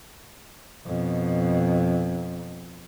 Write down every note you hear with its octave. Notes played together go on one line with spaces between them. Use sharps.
F2 B2